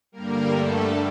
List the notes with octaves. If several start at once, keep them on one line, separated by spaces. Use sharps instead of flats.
G2 D3 G3 A#3 A#4
A3 A4